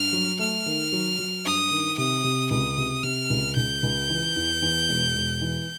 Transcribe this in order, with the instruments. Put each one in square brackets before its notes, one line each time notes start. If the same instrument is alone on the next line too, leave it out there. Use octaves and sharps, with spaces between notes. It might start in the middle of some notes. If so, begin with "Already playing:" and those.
Already playing: [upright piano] G2 [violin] F6
[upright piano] F#3
[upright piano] A3 [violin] F6
[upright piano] D#3
F#3
F#3
[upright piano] G2 [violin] D#6
[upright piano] D#3
[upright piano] C3 [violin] D#6
[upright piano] C3
[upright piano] C#2 [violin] D#6
[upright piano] C3
[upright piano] C3 [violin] F6
[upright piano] C#2
[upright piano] C#2 [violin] G6
[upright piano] C#2
E3
E2
E2
E1
E1
E3